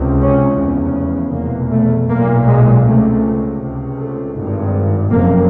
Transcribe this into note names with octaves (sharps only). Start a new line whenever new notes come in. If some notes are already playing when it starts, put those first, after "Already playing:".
Already playing: C#2 C3
C#4
F1 E2 C#3
F1 E2 B2 A#3
A3
B1 A#2 A#3
G#3
C#2 C3 A3
C#2 C3
A3
G#1 G2
F#1 F2 C3 A#3